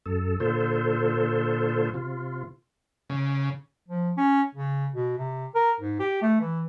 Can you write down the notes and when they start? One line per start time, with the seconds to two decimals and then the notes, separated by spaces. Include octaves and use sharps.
0.06 F#2 A4
0.40 A#2 D3 F4 A4 C5
1.94 C3 F4
3.10 C#3
3.88 F3
4.17 C#4
4.55 C#3
4.94 B2
5.18 C3
5.55 A#4
5.80 G#2
6.00 G4
6.22 A3
6.40 E3